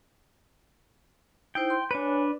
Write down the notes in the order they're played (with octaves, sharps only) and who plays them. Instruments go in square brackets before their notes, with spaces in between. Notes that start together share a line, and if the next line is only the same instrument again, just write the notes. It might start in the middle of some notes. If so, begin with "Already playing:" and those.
[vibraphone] D#4 E4 C5 [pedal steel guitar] G5
[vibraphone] C6
[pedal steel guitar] D4 B4 [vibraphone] C#5 G#5